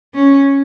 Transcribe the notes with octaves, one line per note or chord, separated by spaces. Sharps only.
C#4